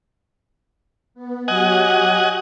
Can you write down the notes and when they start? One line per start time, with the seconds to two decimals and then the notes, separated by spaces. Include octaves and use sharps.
1.14 B3
1.48 F#3 F#4 G4 D#5 F#5 G#5